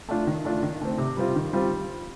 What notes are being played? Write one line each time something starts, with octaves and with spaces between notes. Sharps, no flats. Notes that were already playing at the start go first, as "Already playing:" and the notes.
A3 D4 F4
D#3
A3 D4 F4
D#3
A3 C4
C3
G3 C4 F4
D#3
G3 C4 F4